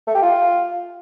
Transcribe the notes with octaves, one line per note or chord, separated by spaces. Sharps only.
A3
G4
F4